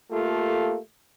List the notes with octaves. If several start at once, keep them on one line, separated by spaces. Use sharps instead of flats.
A3 A#3 F4 G4 A4